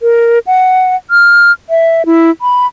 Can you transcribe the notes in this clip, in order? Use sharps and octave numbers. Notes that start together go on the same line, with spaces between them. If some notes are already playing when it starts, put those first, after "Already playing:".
A#4
F#5
F6
E5
E4
B5